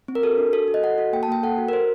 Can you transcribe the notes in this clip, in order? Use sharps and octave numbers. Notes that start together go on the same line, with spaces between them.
C4
A#4
F#4 A4
D4
F#4 A4
F#4
D#5
A4 F#5
F#4
A#3 G5
A5
A#3 G5
A4 F#5
F#4
A#4
F#4 C5